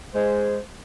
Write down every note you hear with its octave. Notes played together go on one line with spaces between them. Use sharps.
G#3 C5